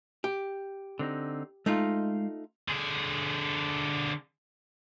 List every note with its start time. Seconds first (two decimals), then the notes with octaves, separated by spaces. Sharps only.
0.24 G4
0.99 D3 C4 D#4
1.66 G#3 A3 D#4 F4 F5
2.68 D3 G#4